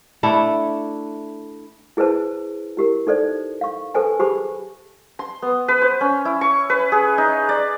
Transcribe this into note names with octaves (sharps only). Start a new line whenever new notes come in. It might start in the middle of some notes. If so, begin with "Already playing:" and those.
A3 D4 E4 A4
E4 G#4 B4 C5 A5
E4 G4 A#4
D#4 A4 C5 D5
F5 C#6
A4 B4 C5 G#5 A5
G4 G#4 C5 A5 B5 D6
C6
B3
B4
C5
C#4
E4
C#6
B4
G#4
D#4
D5